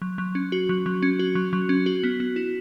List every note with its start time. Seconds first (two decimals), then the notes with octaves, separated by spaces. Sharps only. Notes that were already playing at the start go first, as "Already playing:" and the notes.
0.02 F#3
0.18 F#3
0.35 C#4
0.52 F#4
0.69 F#3
0.86 F#3
1.02 C#4
1.19 F#4
1.35 F#3
1.53 F#3
1.69 C#4
1.86 F#4
2.03 B3
2.20 B3
2.36 E4